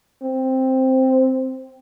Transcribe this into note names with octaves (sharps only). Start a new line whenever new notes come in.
C4